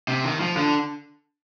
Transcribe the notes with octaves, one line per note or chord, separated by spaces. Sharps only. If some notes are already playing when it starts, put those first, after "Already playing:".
C3
D#3
F3
D3